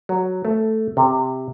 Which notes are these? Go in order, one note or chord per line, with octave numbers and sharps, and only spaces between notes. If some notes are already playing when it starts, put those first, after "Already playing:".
F#3
A3
C3